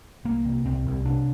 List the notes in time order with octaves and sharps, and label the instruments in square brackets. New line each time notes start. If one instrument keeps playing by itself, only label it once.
[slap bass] C2 A#3
C3
C2 C4
C2
C3 D4